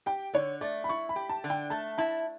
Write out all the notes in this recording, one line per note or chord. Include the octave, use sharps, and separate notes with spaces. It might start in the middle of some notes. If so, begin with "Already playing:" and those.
G4 G5
D3 C#5
A3 D5
B5
E4 C#6
B5
G4
A5
D3
G5
A3 A5
E4 A5